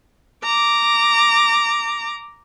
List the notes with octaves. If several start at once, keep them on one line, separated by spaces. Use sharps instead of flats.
A#5 D6